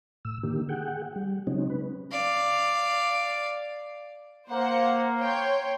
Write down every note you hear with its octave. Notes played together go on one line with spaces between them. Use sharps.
A2 E6
D3 D#3 A#3 G4
G#4 F#5 G5
G3
C#3 F#3 G#3 C4 C#4 D#4
B4
D5 F5
A#3 C5 F#5
C#5 G5 C6